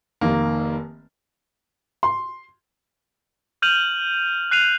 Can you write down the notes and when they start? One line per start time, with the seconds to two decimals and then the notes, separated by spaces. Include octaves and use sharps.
0.21 F1 D#3 A#3
2.03 C6
3.62 F6 G6 D#7 F7 F#7
4.51 F#6 C7 D#7 F7